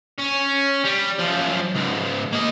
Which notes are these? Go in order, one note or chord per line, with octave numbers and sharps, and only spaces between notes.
C#4
G3
F#2 F3
C#2 G#2
A#3 D#5